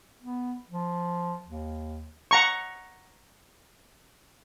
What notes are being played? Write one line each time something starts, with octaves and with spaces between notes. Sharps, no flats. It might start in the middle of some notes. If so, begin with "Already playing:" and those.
B3
F3
D#2
F#5 A#5 C#6